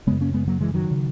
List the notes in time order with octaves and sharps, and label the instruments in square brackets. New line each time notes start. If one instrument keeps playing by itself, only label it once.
[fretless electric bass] F#2 C#3 G#3 B3
A#3 C#4
G#3 B3
F#3 A#3
E3 G#3
D#3 F#3
C#3